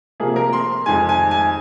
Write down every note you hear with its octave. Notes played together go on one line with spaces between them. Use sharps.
C3 F3 A#3 G#4
A#4
C6
F2 D#3 G#3 G#5
G#5
G#5